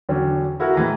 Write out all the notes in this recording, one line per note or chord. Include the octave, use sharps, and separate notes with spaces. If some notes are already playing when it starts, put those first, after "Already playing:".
E2 D3 F#3 C#4 G5
E4 F#4 A4 A#4
A2 E3 G#3 A#5